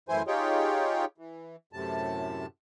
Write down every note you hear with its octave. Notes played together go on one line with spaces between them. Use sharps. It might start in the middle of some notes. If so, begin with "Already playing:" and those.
F#2 A2 E3 E4 C5 G#5
D#4 F4 G4 G#4 C#5 G5
E3
F#2 A2 C3 A5